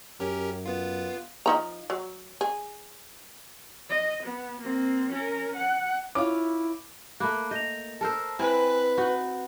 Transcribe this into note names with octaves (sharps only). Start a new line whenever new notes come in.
F#2 C#4 G4 A#4
B3 F4
F3 D#4 A#5
F#3
G#4
D#5
B3
A#3 C4
C#4 A#4
F#5
C#4 E4 F4 D6
A3 A#3 B5 D6 F#6
D#5 G6 A#6 F7
A4 A#4 C5 A5 E6
C4 E4 B4 G#5
D#4 F#4 F#5